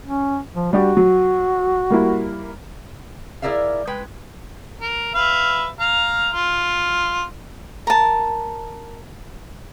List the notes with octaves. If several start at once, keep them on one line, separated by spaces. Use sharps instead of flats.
C#4
F3
G3 D4 F#4 G4
F#3
G3 A#3 E4
E4 G#4 A#4 D5 E5 F5
G#3 B4 G5
A#4
B4 E5 F5
F5 A#5
F4
A#4 A5